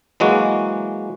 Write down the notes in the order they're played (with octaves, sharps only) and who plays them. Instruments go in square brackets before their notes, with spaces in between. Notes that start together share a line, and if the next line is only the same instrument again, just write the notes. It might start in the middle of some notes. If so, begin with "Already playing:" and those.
[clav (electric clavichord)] E3 F#3 G#3 A#3 F#4